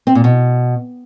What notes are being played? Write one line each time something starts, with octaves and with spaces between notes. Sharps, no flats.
C4
A#2
B2